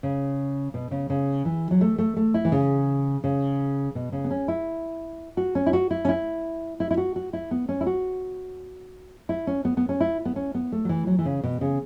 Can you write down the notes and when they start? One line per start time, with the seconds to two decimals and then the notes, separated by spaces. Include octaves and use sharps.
0.03 C#3
0.74 B2
0.91 C#3
1.10 C#3
1.45 E3
1.71 F#3
1.81 A3
1.98 A3
2.17 A3
2.34 E4
2.45 E3
2.52 C#3
3.24 C#3
3.95 B2
4.12 C#3
4.24 B3
4.31 C#4
4.48 E4
5.37 F#4
5.55 C#4
5.67 E4
5.73 F#4
5.91 E4
6.05 C#4
6.09 E4
6.80 E4
6.91 E4
6.97 F#4
7.16 F#4
7.33 E4
7.51 B3
7.69 C#4
7.81 E4
7.87 F#4
9.29 E4
9.47 C#4
9.65 B3
9.77 B3
9.89 C#4
10.00 E4
10.25 B3
10.36 C#4
10.55 B3
10.72 A3
10.85 F#3
10.89 E3
11.07 F#3
11.19 E3
11.25 C#3
11.44 B2
11.61 C#3